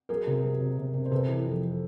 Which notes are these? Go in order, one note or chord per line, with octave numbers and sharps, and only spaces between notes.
F#3 G#4 A#4
C3
F#3
C3
C3
C3
C5
C3 A4 B4
E3
F2